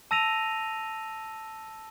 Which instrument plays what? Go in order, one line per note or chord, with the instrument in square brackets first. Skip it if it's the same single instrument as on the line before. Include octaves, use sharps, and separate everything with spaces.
[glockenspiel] A5 E6 A#6 D#7 F7